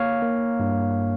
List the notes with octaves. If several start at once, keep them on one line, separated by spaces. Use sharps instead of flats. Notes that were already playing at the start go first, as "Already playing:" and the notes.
Already playing: A#3 C#5 F5
A#3
G2